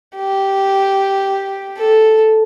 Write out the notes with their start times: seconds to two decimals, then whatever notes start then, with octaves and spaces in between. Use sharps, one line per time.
0.16 G4
1.78 A4